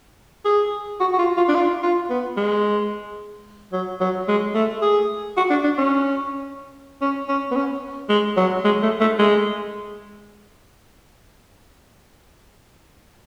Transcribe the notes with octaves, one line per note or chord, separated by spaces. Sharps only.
G#4
F#4
F#4
F4
F4
D4
F4
F4
B3
G#3
F#3
F#3
G#3
A3
G#4
F#4
D4
D4
C#4
C#4
C#4
B3
C#4
G#3
F#3
G#3
A3
A3
G#3